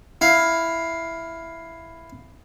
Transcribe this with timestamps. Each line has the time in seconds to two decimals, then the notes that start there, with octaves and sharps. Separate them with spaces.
0.21 E4 F5